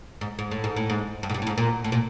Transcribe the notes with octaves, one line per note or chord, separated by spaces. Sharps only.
G#2
G#2
A2
G#2
A2
G#2
G2
G#2
G2
A2
G#2
A#2
A2
A#2